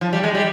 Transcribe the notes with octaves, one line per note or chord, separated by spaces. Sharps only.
F3
G3
G#3
G3